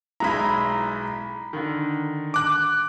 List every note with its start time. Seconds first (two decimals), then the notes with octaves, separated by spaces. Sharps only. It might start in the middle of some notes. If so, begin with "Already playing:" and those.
0.20 B1 G#3 E4 A#5 B5
1.53 D3 D#3
2.34 D6 F#6